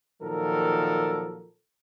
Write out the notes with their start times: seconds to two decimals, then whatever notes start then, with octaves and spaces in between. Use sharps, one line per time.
0.21 A#2 D#3 F3 F#3 A4 A#4